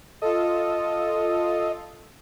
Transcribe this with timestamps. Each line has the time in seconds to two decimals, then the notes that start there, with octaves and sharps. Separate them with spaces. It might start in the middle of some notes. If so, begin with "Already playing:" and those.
0.22 F4 A4 D#5